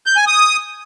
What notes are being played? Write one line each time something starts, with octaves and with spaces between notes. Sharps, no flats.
G6
G#5
D#6